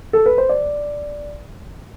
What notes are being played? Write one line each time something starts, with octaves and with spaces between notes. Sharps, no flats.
A4
B4
C5
D5